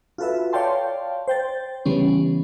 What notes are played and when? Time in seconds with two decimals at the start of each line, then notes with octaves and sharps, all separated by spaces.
0.18 F4 F#4 A4 B4 E5
0.53 C#5 D5 F5 G5 A5 C6
1.28 C5 G5 A6
1.85 C#3 E3 G3 B3 C#4